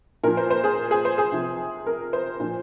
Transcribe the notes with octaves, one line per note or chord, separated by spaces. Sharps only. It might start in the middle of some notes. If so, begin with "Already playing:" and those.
A#2 F3 A#4
C5
C5
G#4
G#4
C5
G#4
C3 F3
A#4
C5
A#2 F3